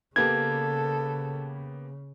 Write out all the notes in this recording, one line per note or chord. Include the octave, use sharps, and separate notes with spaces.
C#3 A#3 B3 G4 A4 G#6